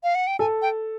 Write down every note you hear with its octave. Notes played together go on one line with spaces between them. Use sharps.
F5
F#5
G5
A4 G#5
G5